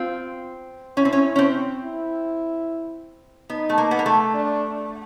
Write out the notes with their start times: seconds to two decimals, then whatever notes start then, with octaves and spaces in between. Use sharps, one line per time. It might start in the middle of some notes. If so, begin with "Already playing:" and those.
Already playing: C4 F4
0.97 C#4 E4
1.05 C4
1.13 C#4
1.36 C#4
1.39 C4
1.82 E4
3.50 B3 D#4
3.69 A3
3.78 A#3
3.91 B3
3.99 A#3
4.06 A3
4.34 D4